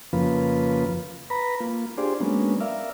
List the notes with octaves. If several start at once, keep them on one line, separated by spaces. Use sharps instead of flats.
F2 C#3 F3 A#3 F4 B4
B4 A#5 B5
A#3 F4
D4 F4 G4 G#4 C5 D5
F#3 G#3 A#3 B3 C#4 D4
A#4 D5 E5 F5